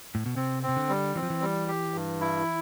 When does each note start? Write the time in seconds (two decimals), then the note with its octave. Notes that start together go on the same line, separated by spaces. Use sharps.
0.15 A2
0.26 B2
0.36 C3 C4
0.63 C4
0.68 C3
0.76 D3
0.89 G3
1.15 E3 C4
1.23 F3
1.30 E3
1.42 G3
1.68 G4
1.94 G2
2.21 E4